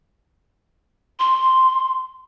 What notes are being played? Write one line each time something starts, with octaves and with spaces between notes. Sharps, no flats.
C6